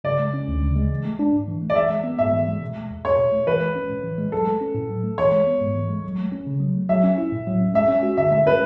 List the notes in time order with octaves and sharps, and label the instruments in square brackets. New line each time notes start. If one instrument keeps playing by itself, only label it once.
[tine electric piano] C#3 [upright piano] D5
[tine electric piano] G#3
C#4
D2
C#3
G#3
E3
A3
D4
G#2
E3
A3
[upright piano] D5
[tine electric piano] E3 [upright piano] E5
[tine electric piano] G#3
B3
[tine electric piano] G#2 [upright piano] E5
[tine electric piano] E3
G#3
B2
A3
E2
[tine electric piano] E2 [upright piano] C#5
[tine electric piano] B2
A3
[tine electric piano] E3 [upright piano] B4
[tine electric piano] G#3
C#4
A2
E3
G#3
[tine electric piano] F#3 [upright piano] A4
[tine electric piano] A3
C#4
A2
F#3
A3
[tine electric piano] E3 [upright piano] C#5
[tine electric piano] G#3
B3
G#2
E3
G#3
F#3
A3
C#4
C#3
F#3
A3
[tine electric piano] F#3 [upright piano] E5
[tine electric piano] C#4
E4
A2
F#3
C#4
[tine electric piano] G#3 [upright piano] E5
[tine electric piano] C#4
F#4
[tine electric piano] D3 [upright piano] E5
[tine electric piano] G#3 [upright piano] E5
[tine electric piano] C#4 [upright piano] B4